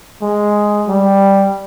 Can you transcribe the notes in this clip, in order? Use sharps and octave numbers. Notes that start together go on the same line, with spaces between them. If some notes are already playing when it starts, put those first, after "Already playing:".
G#3
G3